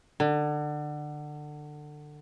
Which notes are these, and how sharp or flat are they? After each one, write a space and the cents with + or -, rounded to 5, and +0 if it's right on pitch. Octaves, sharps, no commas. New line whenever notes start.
D3 +25